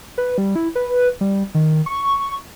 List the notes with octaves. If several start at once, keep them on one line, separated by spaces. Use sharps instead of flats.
B4
G3
E4
B4
G3
D#3
C#6